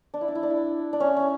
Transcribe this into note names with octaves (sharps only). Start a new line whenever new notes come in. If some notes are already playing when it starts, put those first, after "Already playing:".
D4
E4
D4
E4
D4
E4
D4
D4
C#4
C#4